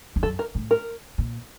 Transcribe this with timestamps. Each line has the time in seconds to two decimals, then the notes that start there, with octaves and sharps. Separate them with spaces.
0.16 F2
0.23 F#2 A4
0.39 A#4
0.55 A2
0.71 A#4
1.18 A#2